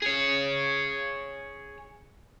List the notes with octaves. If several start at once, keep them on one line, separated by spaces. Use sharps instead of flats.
G#4 C#5